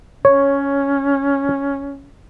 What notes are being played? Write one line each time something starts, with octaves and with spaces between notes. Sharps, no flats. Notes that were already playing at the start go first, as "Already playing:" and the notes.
C#4 C#5